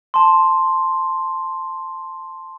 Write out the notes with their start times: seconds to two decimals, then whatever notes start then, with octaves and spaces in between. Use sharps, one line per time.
0.14 A5 C6